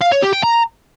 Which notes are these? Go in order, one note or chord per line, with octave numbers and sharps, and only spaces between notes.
F5
C#5
G4
G5
A#5